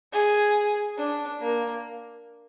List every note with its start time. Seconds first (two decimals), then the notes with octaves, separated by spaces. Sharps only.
0.13 G#4
0.98 D4
1.40 A#3